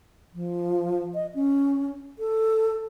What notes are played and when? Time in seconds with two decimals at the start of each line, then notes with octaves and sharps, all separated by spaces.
0.34 F3
1.14 D#5
1.35 C#4
2.19 A4